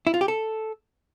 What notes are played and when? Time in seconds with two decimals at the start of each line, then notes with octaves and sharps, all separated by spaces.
0.07 E4
0.14 F4
0.21 G4
0.28 A4